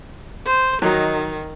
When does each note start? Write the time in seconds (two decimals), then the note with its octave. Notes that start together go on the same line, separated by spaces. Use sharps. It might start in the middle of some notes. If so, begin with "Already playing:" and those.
0.46 C5
0.82 D#3 F#3 D#4